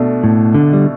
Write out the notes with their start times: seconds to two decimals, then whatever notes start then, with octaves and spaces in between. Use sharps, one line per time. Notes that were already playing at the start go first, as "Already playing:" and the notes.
Already playing: B2 A3 D4
0.24 A2
0.54 D3
0.73 G3